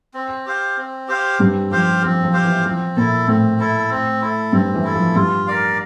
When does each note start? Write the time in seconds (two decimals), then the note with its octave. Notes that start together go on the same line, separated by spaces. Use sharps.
0.14 C4
0.46 G4 C5 F5
0.77 C4
1.08 G4 C5 F5
1.39 G2 G3 C4
1.71 F3 G4 C5 F5
2.02 F3 C4
2.24 F3
2.33 G4 C5 F5
2.45 E3
2.65 F3 C4
2.96 A#2 A#3 E4 A4
3.28 A2 A3 C4
3.59 E4 A4
3.91 C4
4.22 E4 A4
4.52 G2 G3 C4
4.74 E3
4.85 E4 A4
4.94 F3
5.15 G2 G3 F4
5.47 A#4 D5 F5